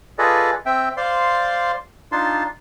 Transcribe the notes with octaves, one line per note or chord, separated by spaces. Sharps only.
F4 G#4 A4 B4 D5 D#5
C4 E5 G5
C5 D5 F5 C6
D4 D#4 F4 A5 C6